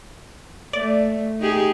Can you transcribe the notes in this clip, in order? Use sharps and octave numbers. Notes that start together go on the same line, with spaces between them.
A3 D5
D#4 G4 G#4